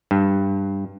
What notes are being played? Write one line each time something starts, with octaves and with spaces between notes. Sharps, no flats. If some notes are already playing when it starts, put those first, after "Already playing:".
G2